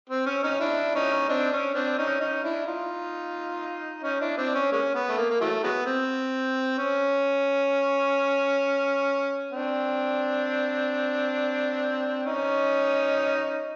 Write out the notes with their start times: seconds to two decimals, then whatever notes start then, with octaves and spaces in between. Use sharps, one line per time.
0.09 C4
0.26 C#4
0.43 C#4 D#4
0.60 D4 E4
0.95 C#4 D#4
1.29 C4 D4
1.52 C#4
1.75 C4 D4
1.98 C#4 D#4
2.20 C#4 D#4
2.43 D4 E4
2.67 D#4 F4
4.03 C#4 D#4
4.20 D4 E4
4.38 C4 D4
4.55 C#4
4.72 G#3 A#3 C#4
4.94 B3
5.09 A3
5.18 A#3
5.30 A#3
5.41 E3 F#3 A3
5.63 F#3 G#3 B3
5.86 C4
6.78 C#4
9.51 C4 D4
12.26 C#4 D#4